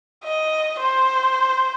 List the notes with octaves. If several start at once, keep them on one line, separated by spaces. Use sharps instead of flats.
D#5
C5